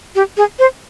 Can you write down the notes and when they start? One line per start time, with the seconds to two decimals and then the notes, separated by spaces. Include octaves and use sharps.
0.15 G4
0.37 G#4
0.59 C5